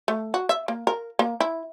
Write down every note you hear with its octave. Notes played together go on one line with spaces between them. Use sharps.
A3
F#4
E5
A#3
A#4
A#3
E4